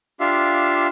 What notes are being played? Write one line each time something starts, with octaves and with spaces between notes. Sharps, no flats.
D4 F4 G4 E5 F5